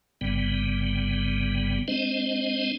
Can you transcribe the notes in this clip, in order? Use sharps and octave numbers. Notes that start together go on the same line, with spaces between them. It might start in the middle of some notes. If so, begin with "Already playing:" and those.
G1 G2 C#3 G3 B3
G#3 C4 D4 C5 D#5